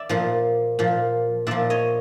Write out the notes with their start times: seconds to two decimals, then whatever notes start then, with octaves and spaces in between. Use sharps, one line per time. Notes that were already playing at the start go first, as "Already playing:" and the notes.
Already playing: D5 E5
0.09 A#2 F3
0.79 A#2 F3
1.47 A#2 F3 D5 E5
1.70 C#5 D#5